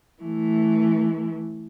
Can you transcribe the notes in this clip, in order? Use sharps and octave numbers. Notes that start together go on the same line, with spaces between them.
E3 A3